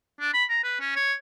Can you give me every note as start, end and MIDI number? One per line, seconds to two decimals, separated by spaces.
0.20 0.34 62
0.34 0.44 83
0.49 0.62 82
0.64 0.80 71
0.80 0.93 61
0.96 1.13 73